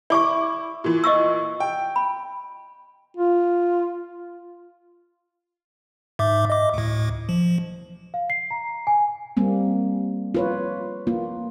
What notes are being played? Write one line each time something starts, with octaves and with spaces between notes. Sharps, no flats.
E4 D5 C#6 D6
A#2 E3
D#5 C#6 E6
G5
B5
F4
G#2 E5 D6
D#5 D6
D2 A2
F3
F5
C7
A#5
G#5
G3 A#3 C4
F4 B4 C#5
A#3 F4